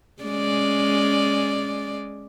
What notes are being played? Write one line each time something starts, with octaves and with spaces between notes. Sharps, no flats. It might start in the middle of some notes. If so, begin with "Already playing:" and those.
G#3 C#4 D5